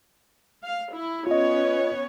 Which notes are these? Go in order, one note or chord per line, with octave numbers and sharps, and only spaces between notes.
F5
E4
B3 C#4 F4 C#5 D#5